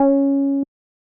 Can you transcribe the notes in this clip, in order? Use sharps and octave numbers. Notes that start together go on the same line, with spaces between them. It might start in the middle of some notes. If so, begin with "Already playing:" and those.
Already playing: C#4